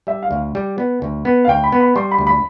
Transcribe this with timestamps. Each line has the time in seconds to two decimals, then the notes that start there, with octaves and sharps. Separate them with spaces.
0.07 G3 E5
0.23 F5
0.31 D2
0.55 G3
0.78 B3
1.02 D2
1.25 B3
1.45 F5
1.48 D2 G5
1.64 B5
1.72 B3
1.80 B5
1.96 G3 C6
2.11 B5
2.19 D2
2.27 B5